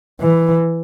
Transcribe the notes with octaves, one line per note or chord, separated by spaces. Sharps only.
E3